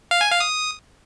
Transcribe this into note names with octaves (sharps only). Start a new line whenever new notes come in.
F5
G#5
F5
D#6